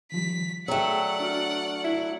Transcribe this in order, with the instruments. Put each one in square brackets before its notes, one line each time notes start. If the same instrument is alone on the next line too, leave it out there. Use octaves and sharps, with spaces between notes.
[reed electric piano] D#3 F3 G3 [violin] B6
[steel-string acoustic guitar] F#3 A3 [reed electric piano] G#4 G5 [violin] D5 F#5
[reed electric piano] D4 F#4 F6
[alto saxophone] E4